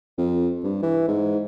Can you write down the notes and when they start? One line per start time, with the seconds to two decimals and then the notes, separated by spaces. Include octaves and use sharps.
0.18 F2
0.64 G2
0.83 E3
1.08 G#2